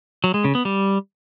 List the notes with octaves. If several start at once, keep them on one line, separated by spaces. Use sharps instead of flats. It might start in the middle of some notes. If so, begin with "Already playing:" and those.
F#3
G#3
C#3
B3
G3